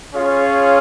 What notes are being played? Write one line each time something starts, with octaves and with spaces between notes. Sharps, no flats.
C#4 F4 G#4 C#5 F5